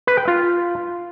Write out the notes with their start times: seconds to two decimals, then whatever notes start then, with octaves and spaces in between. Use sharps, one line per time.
0.07 B4
0.17 G5
0.28 F4